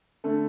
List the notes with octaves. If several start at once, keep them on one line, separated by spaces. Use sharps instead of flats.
D3 A3